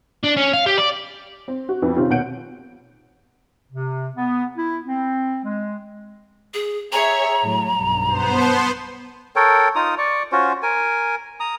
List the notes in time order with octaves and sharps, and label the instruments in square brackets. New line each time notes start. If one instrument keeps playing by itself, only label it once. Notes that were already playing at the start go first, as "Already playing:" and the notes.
[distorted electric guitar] D4
C#4
F5
G4
D5
[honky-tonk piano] C4
F#4
F2 F3 B3 D#4
C3 D#3 C4 C#4 F4 G4
D#2 B2 C#5 F#5 G6 D7
[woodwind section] C3
B3
E4
C4
G#3
[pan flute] G#4
[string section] G#4 C#5 E5 [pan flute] A#5
[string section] A2 F#3
B1 G2
[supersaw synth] B3 C5
[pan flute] A5
[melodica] A4 A#4 C#5 G5
D#4 F4 A#5 D#6
D5 C#6
C#4 F4 F#4 C5
A#4 G#5
A#5 D#6